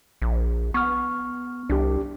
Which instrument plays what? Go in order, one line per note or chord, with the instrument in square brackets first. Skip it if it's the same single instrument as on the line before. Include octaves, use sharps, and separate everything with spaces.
[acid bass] A#1
[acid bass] B3 [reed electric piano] C#6 F6
[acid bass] C2 [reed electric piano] D4 G4